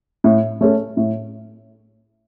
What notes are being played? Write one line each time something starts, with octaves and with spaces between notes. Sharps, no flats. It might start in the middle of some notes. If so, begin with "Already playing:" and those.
A2
A3 C#4 A4
A2